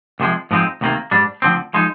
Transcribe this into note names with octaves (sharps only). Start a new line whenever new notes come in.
C2 C3 F3 G#3
G#2 F3 G#3 C4 D#4
D2 C3 D#3 A#3
G#2 G3 D4
D2 D3 F3 C4
F3 G#3 D#4